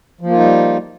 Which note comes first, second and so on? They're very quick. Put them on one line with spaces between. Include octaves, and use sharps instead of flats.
F3 A#3 F4 D#4 G3